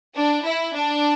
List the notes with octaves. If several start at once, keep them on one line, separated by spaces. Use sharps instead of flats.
D4
E4
D4